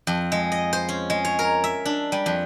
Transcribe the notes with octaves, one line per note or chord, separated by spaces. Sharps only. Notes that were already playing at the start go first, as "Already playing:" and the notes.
F2
G#3
D#5
C5
C#4
G#3
C#5
A#4
E5
D4
G3
F2